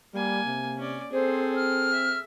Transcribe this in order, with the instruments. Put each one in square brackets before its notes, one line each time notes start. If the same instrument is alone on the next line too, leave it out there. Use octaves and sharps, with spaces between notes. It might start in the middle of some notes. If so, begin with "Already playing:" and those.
[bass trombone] G3 [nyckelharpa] A#3 G#5
[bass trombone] C3
[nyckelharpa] C#4 D5
[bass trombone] C4 [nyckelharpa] G#4 A4 [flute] C5
[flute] F6
[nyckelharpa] E5